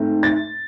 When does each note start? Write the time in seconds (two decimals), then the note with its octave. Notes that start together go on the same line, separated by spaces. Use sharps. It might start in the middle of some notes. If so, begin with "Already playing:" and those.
Already playing: G#2 A3 C4
0.23 A6